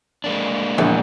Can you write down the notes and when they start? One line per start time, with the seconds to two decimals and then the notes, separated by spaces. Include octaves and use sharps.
0.24 G#3 A#3 D4
0.78 A#1 E2